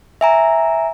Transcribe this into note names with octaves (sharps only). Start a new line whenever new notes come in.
E5 G#5 A#5